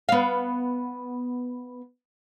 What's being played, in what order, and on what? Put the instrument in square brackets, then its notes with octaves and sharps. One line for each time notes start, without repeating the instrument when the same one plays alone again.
[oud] B3 F5